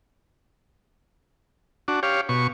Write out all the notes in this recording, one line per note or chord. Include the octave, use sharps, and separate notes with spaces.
D4 F#4
G4 C#5 F5
B2 C#6